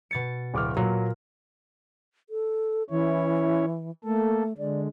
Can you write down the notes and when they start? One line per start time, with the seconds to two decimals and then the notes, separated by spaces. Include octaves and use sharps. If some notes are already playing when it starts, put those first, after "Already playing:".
0.11 B2 A6 C#7
0.54 D1 D6 F6
0.77 A#2 F#3
2.30 A4
2.90 E3 C#4 E4 C#5
4.04 A3 A#3 A4
4.58 D3 G#3 D5